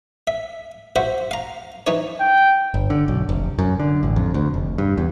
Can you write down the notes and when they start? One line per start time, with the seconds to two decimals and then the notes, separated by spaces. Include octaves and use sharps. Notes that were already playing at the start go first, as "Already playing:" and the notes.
0.27 E5
0.96 F#4 C5 E5
1.31 F5 A#5
1.87 E3 D#4 C#5
2.21 G5
2.74 G1
2.90 D3
3.08 B1
3.29 F1
3.59 F#2
3.80 D3
4.03 A1
4.16 F2
4.34 D2
4.54 F1
4.78 G2
4.98 E2